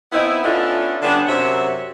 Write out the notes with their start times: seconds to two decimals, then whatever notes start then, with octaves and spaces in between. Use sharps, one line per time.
0.12 B3 C4 D#4 E4
0.44 B3 C#4 D4 E4 F4 A4
1.02 D3 G3 B3 C#4 D4
1.27 F#2 C3 F#3 C#5 E5 F#5